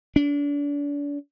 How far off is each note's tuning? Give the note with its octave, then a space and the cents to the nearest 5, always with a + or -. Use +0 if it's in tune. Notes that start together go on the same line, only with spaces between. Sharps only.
D4 -35